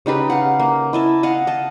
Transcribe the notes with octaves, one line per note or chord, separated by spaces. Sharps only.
C#3 D#4 G4 B4
F5 F#5
A#3
E4 D#5 A5
D#5 F5 F#5
D#5 A5